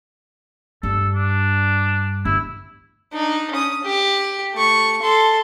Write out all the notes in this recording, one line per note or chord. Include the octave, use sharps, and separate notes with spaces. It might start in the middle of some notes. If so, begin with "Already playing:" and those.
G2 A4
D4
G1 E4
D4 D#4
C#4 D#6
G4
A3 C#6
A4 C6